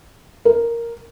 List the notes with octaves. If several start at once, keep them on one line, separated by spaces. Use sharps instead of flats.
A#4